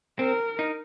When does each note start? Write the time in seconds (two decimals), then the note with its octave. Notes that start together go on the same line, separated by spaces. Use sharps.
0.19 C4 A#4
0.59 D#4